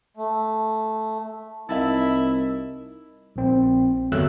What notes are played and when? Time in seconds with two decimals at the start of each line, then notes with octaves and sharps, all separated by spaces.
0.17 A3
1.69 C2 D#4 E4 A#4 D#5 E5 A5 A6
3.36 A#1 C4
4.12 G1 E2 F#3 A3 E6 F#6